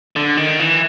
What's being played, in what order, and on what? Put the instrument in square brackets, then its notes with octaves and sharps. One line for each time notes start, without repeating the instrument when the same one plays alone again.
[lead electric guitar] D3
D#3
E3